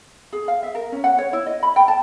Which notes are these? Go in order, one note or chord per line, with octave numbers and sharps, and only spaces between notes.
G#4
F5
E5
A#4
C#4
F#5
C#5
E4
D#5
B5
G5
A5